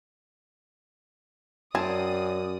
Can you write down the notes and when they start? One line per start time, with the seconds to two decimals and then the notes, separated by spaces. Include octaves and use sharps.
1.75 F#2 C4 C#4 D5 G#5 A5 D#6